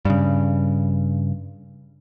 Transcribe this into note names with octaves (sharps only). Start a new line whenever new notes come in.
G2 C#3